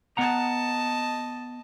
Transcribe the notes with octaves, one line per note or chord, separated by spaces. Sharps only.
B3 D#5 F#5 A5 A#5